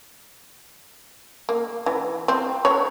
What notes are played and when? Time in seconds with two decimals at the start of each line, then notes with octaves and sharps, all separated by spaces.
1.49 A#3
1.86 E3
2.28 C4
2.65 C#5